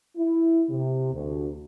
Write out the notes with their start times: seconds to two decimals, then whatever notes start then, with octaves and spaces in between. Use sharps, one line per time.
0.17 E4
0.69 C3
1.13 D2